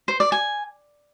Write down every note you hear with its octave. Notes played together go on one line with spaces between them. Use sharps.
C5
D5
G#5